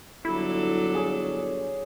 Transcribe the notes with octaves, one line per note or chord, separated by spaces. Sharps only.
G1 F#3 E4 A4 D5
G#4 C#5